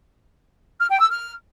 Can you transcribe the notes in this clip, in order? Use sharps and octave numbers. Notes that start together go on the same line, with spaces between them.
F6
G5
E6
F6